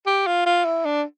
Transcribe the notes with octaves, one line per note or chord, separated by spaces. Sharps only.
G4
F4
F4
E4
D4